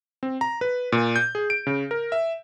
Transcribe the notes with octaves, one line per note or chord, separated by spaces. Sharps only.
C4
A#5
B4
A#2
G6
G#4
D7
C#3
A#4
E5